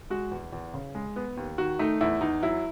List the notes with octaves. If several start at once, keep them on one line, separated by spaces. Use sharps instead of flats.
G#3 F#4
E2
E2
C#3
G#3
B3
D#2
D#3 F#4
A3 D#4
E2 E4
E2 D#4
F#3 E4